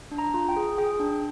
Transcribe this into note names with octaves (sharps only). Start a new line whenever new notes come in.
D4
A#5
F4
G5
G#4
G#4 G5
D4